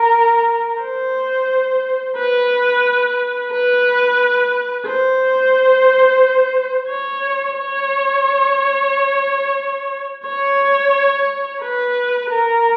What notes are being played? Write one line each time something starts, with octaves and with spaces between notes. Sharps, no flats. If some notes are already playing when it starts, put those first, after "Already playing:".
Already playing: A#4
C5
B4
B4
C5
C#5
C#5
C#5
B4
A#4